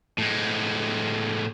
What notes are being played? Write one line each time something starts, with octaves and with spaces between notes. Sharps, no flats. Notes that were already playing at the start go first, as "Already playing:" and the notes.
A2 G#3